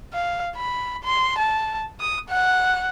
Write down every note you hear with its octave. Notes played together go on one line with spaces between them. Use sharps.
F5
B5
C6
A5
D#6
F#5